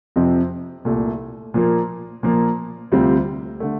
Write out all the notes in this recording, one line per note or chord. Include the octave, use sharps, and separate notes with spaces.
F2 C3 F3 C4
C2 A#2 A3
A#2 F3 A#3
A#2 F3 A#3
D2 C3 G3 C4 F4
D3 A3